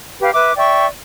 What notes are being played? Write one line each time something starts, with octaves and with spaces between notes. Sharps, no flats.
G4 B4 F5
B4 E5 D6
D5 E5 G5 C#6